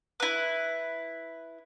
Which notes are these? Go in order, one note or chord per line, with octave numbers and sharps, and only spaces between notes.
E4 B4